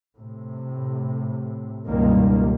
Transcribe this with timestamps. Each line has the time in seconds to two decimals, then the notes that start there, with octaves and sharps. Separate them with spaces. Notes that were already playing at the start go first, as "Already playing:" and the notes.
0.18 A2 C3
1.88 C#2 G2 B2 D#3 G3 A#3